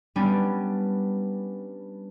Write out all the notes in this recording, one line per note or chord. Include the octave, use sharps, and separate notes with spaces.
G3 B3 C#4 D4